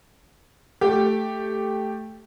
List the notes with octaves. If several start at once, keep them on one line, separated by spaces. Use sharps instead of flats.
A3 G4